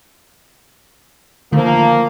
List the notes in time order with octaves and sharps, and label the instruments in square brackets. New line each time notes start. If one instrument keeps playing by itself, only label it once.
[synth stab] D3 D#3 A3 [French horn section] F3 A#3